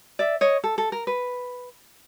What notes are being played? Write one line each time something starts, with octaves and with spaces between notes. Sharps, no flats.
D5 E5
C#5 D#5
A4
A4
A#4
B4